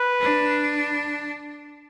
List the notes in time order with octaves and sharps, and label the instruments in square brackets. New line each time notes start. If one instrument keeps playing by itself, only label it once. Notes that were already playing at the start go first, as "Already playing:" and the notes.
Already playing: [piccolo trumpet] B4
[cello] D4